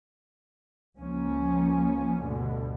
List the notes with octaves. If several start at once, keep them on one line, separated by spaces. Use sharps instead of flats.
C#2 F3 A#3 C#4
D2 G2 B2 D3